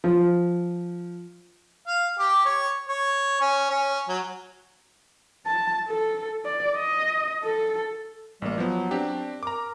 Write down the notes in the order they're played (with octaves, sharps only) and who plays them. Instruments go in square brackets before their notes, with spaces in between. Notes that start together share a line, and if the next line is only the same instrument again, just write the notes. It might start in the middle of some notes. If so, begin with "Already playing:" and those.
[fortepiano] F3
[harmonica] F5
G4
C#5
C#5
C#4
C#4
F#3
[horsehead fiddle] A5
A4
D5
D#5
A4
[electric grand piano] A1 A#3 [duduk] G3
[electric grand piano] F3 B3 [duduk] F#3
[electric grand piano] C4 D4 G4
[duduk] A#4 [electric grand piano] A#5 D6